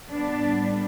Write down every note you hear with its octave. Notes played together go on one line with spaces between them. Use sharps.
A2 G3 B3 D4